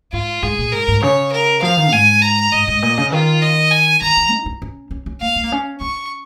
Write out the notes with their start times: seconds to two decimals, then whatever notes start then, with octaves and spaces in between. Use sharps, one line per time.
0.13 G#2 F4
0.42 G#2 G#4
0.58 A#2
0.73 G#2 A#4
0.88 G#2
1.02 C#3 C#5
1.33 A#4
1.62 F3 F5
1.77 D#3
1.92 G#2 G#5
2.22 A#5
2.52 G#2 D#5
2.68 G#2
2.82 A#2
2.98 C#3
3.12 D#3 F4
3.42 D#5
3.71 G#5
4.01 D#3 A#5
4.17 D#3
4.31 D#4
4.46 D#4
4.62 C#4
4.91 C#4
5.06 C#4
5.21 A#3 F5
5.36 C#4
5.43 A#3
5.52 C#4
5.81 C#4 C#6